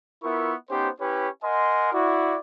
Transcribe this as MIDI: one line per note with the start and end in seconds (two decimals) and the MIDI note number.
0.23 0.54 59
0.23 0.54 64
0.23 0.54 65
0.23 0.54 70
0.23 0.54 76
0.23 0.54 85
0.70 0.88 59
0.70 0.88 61
0.70 0.88 63
0.70 0.88 67
0.70 0.88 72
1.00 1.28 61
1.00 1.28 64
1.00 1.28 67
1.00 1.28 71
1.00 1.28 73
1.44 1.93 70
1.44 1.93 75
1.44 1.93 78
1.44 1.93 80
1.44 1.93 84
1.93 2.37 64
1.93 2.37 66
1.93 2.37 74